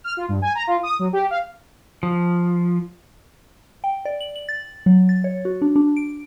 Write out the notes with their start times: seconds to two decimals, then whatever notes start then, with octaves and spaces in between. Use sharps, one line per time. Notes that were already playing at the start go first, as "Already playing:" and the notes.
0.04 F6
0.17 F4
0.28 G2
0.42 G#5
0.55 A#5
0.67 F4
0.83 D#6
0.99 F#3
1.13 G4
1.30 F5
2.03 F3
3.84 G5
4.05 D5
4.21 F#7
4.36 F#7
4.49 A6
4.86 F#3
5.09 A6
5.24 C#5
5.45 F#4
5.62 D4
5.76 D4
5.97 D7